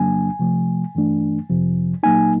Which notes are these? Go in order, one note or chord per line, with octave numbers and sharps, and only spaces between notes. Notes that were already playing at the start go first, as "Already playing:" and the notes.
Already playing: F2 C#3 F#3 A#3 D4 G#5
C3 F3 A3
G2 E3 A3 D4
F2 C3 F3
A#2 F#3 A#3 D#4 G#5